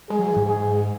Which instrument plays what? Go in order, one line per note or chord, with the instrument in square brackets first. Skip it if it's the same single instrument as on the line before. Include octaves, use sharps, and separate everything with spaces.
[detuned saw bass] G#3 [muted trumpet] G#4
[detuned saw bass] F#3
E3
G#2
[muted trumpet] G#4